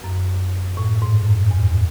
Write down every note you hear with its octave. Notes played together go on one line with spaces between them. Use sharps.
F#2
A2
G#2
F#2
E2